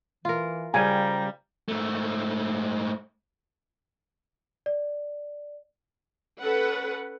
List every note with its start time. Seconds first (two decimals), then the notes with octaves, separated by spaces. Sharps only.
0.25 E3 F4 A#4
0.74 C#3 F3 G3 G5 G#5 A#5
1.68 G#2 A3
4.66 D5
6.42 C#4 A4 B4 F#5